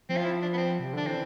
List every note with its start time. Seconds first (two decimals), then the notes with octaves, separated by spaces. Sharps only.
0.09 F3 C4
0.17 F4
0.25 E4
0.42 D4
0.53 B3
0.57 C4
0.80 C3
0.93 D3 D4
1.06 E3 C4